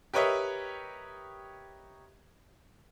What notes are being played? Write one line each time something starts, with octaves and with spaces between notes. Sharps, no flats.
G4 A#4 B4 C#5 D#5 E5